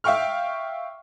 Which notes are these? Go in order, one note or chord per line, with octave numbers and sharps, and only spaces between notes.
E5 F5 G5 C#6 F6